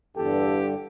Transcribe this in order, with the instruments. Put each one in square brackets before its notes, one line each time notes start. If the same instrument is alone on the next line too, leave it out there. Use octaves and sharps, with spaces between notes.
[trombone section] E2 A4 [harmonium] G2 D3 [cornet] G4